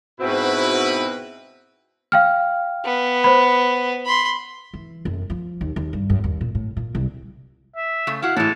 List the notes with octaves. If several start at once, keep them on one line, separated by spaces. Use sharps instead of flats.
G#2 B2 C4 E4 F#4 B4
F5 G5 F6
B3
C5 B5
B5 C6
E3
F#1
F3
D#2
D#2
G2
F#2
D#2
A#2
A2
A#2
C2
E5
C#3 A3
E4 F#4 F5
A2 E3 G#3 A4